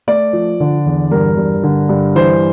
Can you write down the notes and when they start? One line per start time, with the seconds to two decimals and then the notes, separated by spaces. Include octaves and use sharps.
0.07 A3 D5
0.33 F3
0.60 D3
0.86 E2
1.11 G2 A#4
1.37 G2
1.63 D3
1.89 G2
2.15 E3 C5